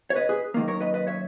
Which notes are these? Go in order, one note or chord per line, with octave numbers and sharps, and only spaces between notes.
C#5
B4 D#5
G#4 B4
F#2 D#3 A#3
A#4 C#5
B4 D#5
B4 D#5
C#5 E5